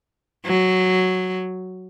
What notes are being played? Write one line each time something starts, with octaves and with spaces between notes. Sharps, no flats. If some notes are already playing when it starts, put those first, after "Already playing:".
F#3